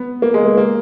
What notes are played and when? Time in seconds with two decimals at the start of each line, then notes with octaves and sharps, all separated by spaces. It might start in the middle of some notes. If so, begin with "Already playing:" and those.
Already playing: B3
0.22 A#3
0.34 G#3
0.46 A#3
0.57 A#3